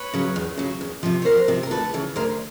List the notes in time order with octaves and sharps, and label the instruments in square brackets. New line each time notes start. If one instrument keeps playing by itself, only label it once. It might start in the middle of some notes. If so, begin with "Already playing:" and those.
Already playing: [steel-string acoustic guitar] B4 C#5
C#3 F#3
E2
C#3 F#3
E2
C3 F3
C#5
E2 A#4 C5
C3 F3
A#4
D2 A4 B4
C#3 E3
D2 A#4 C5